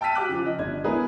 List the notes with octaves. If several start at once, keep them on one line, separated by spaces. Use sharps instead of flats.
G5 A5 E6 F6 B6 D#7
F#4 G4 D6 F#6
C#3 F3
D#5
G1 D4 G#6
G#3 B3 E4 G#4 A#4 B4